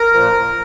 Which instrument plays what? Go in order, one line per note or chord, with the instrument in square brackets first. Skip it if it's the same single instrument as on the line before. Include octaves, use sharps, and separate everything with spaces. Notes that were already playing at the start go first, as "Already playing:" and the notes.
Already playing: [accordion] A#4
A#2 F3